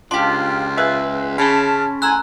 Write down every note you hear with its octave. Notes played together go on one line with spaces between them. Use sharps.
C#2 D4 F4 G4 C6
G#4 B4 E5
C#3 C#4 A5 B5 F6
A2 G#5 A#5 C6 E6 F#6 G#6